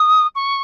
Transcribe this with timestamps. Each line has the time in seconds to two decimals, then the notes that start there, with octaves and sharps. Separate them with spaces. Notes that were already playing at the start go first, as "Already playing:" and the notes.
Already playing: D#6
0.35 C#6